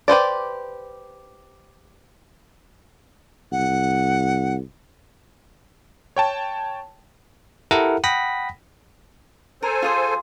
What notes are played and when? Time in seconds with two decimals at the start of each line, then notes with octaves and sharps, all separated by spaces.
0.08 G4 B4 C5 D5
3.52 C2 F#5
6.16 C#5 G5 A5
7.71 E4 G4 A4 A#4 E5 F#5
8.04 F#5 G5 B5 D#6 A#6 B6
9.63 A4 A#4 C5 G#5
9.82 F4 G#4 C6